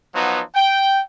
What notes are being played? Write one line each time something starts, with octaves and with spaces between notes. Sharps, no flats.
F3 F#3 B3 D#4
G5